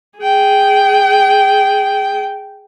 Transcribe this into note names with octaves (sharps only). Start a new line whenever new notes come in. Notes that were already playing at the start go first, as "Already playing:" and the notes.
G#4 G5